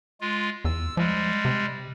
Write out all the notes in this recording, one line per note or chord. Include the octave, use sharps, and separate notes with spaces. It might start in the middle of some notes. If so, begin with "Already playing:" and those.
G#3 F4
E2 E6
F3 G3 G#3
C3